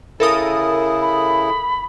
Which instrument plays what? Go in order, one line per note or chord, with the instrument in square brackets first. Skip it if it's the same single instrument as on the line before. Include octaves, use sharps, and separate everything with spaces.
[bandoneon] C#3 E4 [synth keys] A4 A#4 D#6
[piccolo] B5